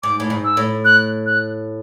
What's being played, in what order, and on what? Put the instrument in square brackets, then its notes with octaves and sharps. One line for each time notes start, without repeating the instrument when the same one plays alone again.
[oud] G#2 [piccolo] D6
[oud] A2
G#2
[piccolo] E6
[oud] A2
[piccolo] F#6
F#6